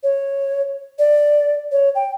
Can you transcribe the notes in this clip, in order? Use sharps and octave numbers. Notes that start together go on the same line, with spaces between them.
C#5
D5
C#5
G5